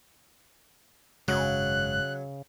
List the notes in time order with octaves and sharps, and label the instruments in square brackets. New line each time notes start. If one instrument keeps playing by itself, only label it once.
[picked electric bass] G#1 F#2 G#3 [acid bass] C#3 [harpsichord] F#3 [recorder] F#6